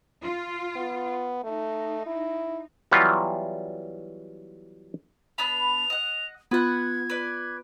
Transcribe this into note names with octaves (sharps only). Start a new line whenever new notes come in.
F4
B3
A3 D#4
E4
E3 F#3 G3 B3 F4
B3 D4 B5 F7
D#5 F#5
B3 F4 B4 F#5 G#6
B4 D5